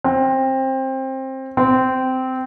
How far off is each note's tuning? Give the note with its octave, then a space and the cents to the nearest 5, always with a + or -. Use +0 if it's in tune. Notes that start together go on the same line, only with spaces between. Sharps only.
C4 +20
C4 -15